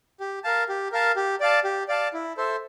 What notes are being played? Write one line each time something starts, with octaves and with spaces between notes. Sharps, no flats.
G4
A#4 F5 A5
G4
A#4 F5 A5
G4
D5 F5 A5
G4
D5 F5 A5
E4
A4 C5 E5